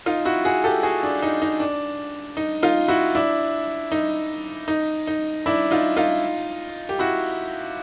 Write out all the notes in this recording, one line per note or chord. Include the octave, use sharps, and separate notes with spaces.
D#4 F4
E4 F#4
F#4 G#4
G4 A4
F#4 G#4
D4
D#4
D#4
D4
D#4
D#4 F4
E4 F#4
D4 E4
D#4
D#4
D#4
D4 E4
D#4 F4
D#4 F4
G4
E4 F#4